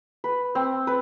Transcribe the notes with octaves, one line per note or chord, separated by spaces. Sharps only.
B4
C4
B4